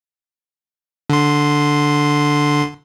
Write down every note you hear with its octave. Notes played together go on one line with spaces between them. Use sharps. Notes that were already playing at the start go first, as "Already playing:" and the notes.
D3 C6